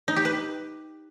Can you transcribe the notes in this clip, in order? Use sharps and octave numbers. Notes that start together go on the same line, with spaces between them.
D#4
G4
B4